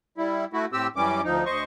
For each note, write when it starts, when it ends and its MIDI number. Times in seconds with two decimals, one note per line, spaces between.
0.18 0.45 55
0.18 0.45 64
0.53 0.66 57
0.53 0.66 64
0.53 0.66 66
0.73 0.87 45
0.73 0.87 60
0.73 0.87 67
0.73 0.87 88
0.96 1.21 42
0.96 1.21 52
0.96 1.21 55
0.96 1.21 61
0.96 1.21 86
1.24 1.44 38
1.24 1.44 53
1.24 1.44 63
1.45 1.64 38
1.45 1.64 72
1.45 1.64 75
1.45 1.64 85